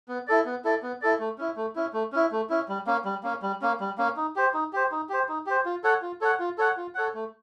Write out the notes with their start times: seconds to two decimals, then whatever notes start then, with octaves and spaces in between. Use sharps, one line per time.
0.08 B3
0.27 E4 A4 D5
0.45 B3
0.64 E4 A4 D5
0.82 B3
1.01 E4 A4 D5
1.19 A3
1.38 C#4 E4
1.56 A3
1.75 C#4 E4
1.93 A3
2.12 C#4 E4
2.31 A3
2.49 C#4 E4
2.68 G3
2.87 A#3 C#4
3.05 G3
3.23 A#3 C#4
3.42 G3
3.62 A#3 C#4
3.80 G3
3.98 A#3 C#4
4.17 D#4
4.36 G4 C5
4.54 D#4
4.73 G4 C5
4.92 D#4
5.09 G4 C5
5.29 D#4
5.46 G4 C5
5.66 F4
5.84 A4 C#5 F#5
6.02 F4
6.21 A4 C#5 F#5
6.39 F4
6.58 A4 C#5 F#5
6.77 F4
6.95 A4 C#5 F#5
7.14 A3